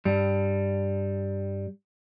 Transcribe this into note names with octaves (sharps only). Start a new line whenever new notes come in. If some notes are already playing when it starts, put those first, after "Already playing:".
G2 G3